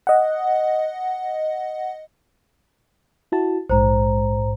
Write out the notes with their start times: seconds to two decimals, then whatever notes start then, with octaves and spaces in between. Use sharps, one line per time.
0.07 D#5 F#5
3.32 E4 F#4 A5
3.70 A#1 G#2 C5 A#5